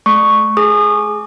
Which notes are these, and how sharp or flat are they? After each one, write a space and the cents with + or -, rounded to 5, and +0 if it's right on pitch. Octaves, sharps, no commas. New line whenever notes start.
A3 -45 C#6 +0
G#4 +15 D#6 -30